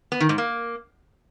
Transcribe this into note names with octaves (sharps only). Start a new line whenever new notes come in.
B3
D#3
G#2
A#3